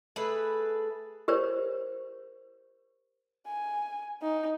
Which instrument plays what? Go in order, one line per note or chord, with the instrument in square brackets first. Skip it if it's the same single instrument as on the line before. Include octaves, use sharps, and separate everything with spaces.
[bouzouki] A3 G#4 B4
[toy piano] G4 A#4 C5 C#5
[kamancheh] G#5
D#4